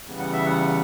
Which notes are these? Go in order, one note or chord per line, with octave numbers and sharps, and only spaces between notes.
E2 C#3 G3 B3
F#5
E5
F#5